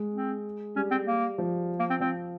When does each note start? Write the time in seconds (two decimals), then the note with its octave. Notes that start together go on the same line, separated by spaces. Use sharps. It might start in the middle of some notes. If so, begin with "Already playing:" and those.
Already playing: G#3
0.14 C4
0.76 G3 C#4
0.91 C4
1.07 A#3
1.38 F3
1.79 A#3
1.90 C4
2.00 F3 C4